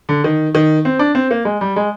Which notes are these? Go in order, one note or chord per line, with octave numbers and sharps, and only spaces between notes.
D3
D#3
D#3
C4
D4
C4
A#3
G#3
G3
G#3